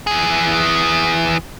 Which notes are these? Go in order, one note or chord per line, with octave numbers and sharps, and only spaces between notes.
E3 G#4